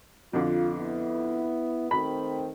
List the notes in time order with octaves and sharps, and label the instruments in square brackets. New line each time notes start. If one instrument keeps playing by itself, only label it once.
[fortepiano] F2 D3 [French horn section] F4
[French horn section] B3 E4
[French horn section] D#3 A3 C4 [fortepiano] B5